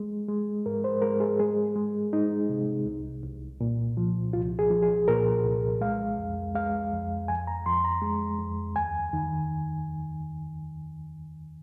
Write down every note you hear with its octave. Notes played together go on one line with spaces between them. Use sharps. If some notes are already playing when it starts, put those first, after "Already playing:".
Already playing: G#3
G#3
G#2 A#4
C5
G#3 A#4
G#4
G#3 G#4
G#3
G#3 D#4
C3
C2
C2
A#2
F3
C2 F4
G#4
F3
G#4
A#2 A#4
C2
G#3 F5
F2
G#3 F5
F2
F2 G#5
A#5
F2 C6
A#5
G#3
F2
D#2 G#5
D#3